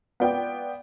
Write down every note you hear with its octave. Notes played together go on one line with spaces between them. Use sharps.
B3 F4 D5 G5